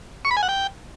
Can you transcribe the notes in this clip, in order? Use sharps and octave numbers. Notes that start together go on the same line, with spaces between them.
C#6
B5
G#5
F#5
G5